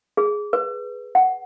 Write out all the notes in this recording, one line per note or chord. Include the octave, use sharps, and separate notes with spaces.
G#4
B4
F#5